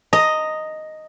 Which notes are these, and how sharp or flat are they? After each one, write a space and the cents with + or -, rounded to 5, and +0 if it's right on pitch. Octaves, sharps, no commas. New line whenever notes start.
D#5 +0 A#5 -20